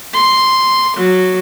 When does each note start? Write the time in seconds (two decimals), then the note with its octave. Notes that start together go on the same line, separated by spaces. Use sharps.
0.14 C6
0.97 F#3